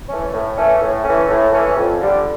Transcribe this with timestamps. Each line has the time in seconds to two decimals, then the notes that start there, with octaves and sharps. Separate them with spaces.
0.08 E3 A3 C#4
0.32 A2
0.56 E3 A3 C#4
0.81 A2
1.04 E3 A3 C#4
1.28 A2
1.52 E3 A3 C#4
1.77 F2
2.00 D3 G3